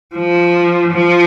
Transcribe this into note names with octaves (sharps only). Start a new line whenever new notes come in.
F3
F3